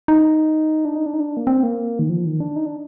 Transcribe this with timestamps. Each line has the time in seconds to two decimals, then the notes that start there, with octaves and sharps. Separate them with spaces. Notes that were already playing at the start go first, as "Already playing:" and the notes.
0.08 D#4
0.85 D4
0.96 D#4
1.06 D4
1.14 D#4
1.20 D4
1.37 A#3
1.47 C4
1.63 A#3
1.99 D#3
2.09 F3
2.25 D#3
2.40 D4
2.56 D#4
2.66 D4